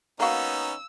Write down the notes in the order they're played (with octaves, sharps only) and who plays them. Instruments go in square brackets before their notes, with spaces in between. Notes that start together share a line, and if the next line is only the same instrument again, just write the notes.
[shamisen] A#3 F#4 [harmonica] B3 C#4 D#4 [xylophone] F5 A#5 [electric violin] E6